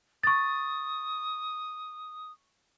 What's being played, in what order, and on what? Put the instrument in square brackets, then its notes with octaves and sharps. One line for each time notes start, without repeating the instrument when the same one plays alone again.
[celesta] C#6 A6 [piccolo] D#6